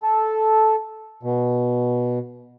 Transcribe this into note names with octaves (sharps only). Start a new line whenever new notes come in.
A4
B2